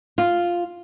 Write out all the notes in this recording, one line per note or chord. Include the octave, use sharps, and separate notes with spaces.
F4